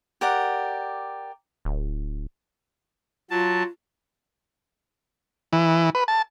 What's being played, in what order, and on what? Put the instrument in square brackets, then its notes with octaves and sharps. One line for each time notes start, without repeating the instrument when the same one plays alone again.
[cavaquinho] G4 A#4 D5 F#5
[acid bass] D1
[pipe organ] F#3 A5 [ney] F4
[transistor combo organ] E3
B4
A5